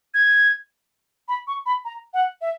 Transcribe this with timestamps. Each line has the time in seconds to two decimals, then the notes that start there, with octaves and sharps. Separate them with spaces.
0.14 G#6
1.28 B5
1.47 C#6
1.66 B5
1.85 A#5
2.14 F#5
2.41 E5